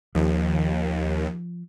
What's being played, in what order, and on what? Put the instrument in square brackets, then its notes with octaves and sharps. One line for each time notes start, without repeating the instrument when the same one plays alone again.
[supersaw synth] D#2 [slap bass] F3